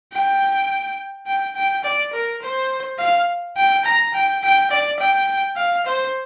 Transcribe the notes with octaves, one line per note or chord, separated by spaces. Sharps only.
G5
G5
G5
D5
A#4
C5
F5
G5
A#5
G5
G5
D5
G5
F5
C5